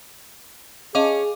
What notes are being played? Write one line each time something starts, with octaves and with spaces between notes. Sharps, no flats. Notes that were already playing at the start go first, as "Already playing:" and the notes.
C#4 G#4 D#5 F5 D6